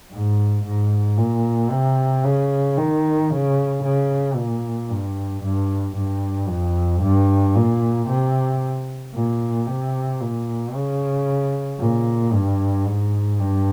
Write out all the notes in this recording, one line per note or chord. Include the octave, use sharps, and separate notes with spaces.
G#2
G#2
A#2
C3
C#3
D#3
C#3
C#3
A#2
G2
G2
G2
F2
G2
A#2
C3
A#2
C3
A#2
C#3
A#2
G2
G#2
G2